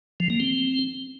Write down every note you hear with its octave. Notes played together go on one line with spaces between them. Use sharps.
F3
A#3
C4